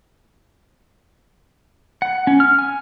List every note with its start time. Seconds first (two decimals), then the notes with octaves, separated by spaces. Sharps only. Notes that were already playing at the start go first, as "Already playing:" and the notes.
2.02 F#5
2.27 C#4
2.40 F6
2.59 G#5